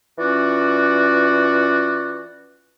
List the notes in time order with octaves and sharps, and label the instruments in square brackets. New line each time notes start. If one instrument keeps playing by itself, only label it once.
[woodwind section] E3 C#4 F4 F#4 D5